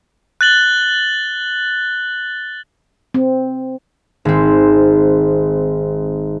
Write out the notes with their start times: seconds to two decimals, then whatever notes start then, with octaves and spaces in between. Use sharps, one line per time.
0.41 F#6 A6 F#7 G7
3.14 C4
4.25 G#1 C4